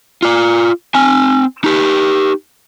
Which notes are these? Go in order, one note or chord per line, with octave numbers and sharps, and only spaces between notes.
F4 D5
C4 G#5
D#4 G4